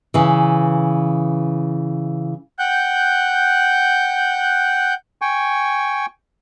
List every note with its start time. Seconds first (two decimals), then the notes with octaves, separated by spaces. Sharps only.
0.14 C#3 E3
2.59 F#5 G5 F#6 G6
5.22 G5 G#5 C#6